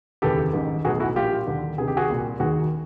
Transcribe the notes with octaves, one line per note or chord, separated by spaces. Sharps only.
F1 D#2 C#3 E3 G4 A4
A1 G#2 D#3
B1 A2 E3 F#4 G#4
E4 F#4
A#1 A#2 F4 G4
D#2 D3
D2 C3 D#3 G#4
G4
F#4 G#4
C2 A#2
D#2 D#3 F#4 G#4